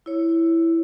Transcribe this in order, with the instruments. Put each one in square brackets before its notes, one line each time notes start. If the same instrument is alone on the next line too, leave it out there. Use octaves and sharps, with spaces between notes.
[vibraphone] E4 C#5